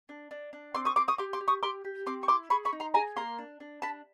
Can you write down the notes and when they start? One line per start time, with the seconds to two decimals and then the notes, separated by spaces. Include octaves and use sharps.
0.09 D4
0.31 D4
0.53 D4
0.75 C4 C6 D6
0.85 C#6 D#6
0.96 C4 C6 D6
1.08 C#6 D#6
1.18 G4 C6 D6
1.33 C6 D6
1.41 G4
1.48 C#6 D#6
1.63 G4 C6 D6
1.85 G4
2.06 C4 C6 D6
2.23 C#6
2.28 E4 C6 D6
2.50 G#4 B5 C#6
2.65 B5 C#6
2.73 D#4
2.80 A#5 C6
2.94 G#4 G#5 A#5
3.16 A#3 A#5 C6
3.38 D4
3.60 D4
3.82 D4 A5 B5